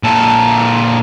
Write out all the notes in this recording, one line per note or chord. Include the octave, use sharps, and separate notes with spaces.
A#2 A4